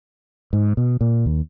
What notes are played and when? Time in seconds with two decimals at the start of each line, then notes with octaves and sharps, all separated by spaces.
0.53 G#2
0.77 B2
1.01 A#2
1.26 D#2